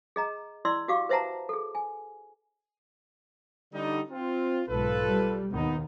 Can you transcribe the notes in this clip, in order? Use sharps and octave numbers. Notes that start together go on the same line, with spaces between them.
G#4 D#5 A#5
E4 D5 C6 E6
F#4 G4 F5 D6
B4 C5 E5 F#5 A5 A#5
G#4 A4
G#5
D3 G3 D#4
C4 F4
B1 G#2 F4 A4 B4
G3
D#2 B2 D#3 B3 D#4